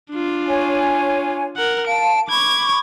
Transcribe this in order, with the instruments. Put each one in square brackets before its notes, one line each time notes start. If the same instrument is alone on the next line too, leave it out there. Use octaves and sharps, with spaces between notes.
[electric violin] D4 F4
[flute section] C#5 G#5
[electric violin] A#4 F#5
[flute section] F5 A5 [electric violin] D7
[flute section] B5 C#6 [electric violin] D6 G#6